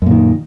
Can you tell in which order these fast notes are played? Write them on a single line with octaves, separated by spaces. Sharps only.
F#2 A#2 D#3